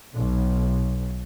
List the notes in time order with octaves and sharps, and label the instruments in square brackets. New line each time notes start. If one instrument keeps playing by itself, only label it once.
[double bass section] B1